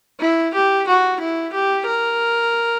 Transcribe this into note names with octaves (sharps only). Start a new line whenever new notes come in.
E4
G4
F#4
E4
G4
A#4